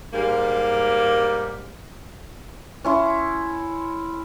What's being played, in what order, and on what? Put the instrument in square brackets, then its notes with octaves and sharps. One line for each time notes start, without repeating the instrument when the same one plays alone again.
[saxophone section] G#2 G3 A#3
[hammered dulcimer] C#4 E4 C6